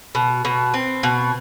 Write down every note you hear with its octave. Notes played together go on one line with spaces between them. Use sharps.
B2
B2
C4
B2